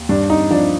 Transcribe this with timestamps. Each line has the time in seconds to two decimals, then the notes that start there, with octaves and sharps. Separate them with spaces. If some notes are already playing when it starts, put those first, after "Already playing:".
Already playing: D#2
0.09 G2 D4
0.30 D#4
0.51 F3 D4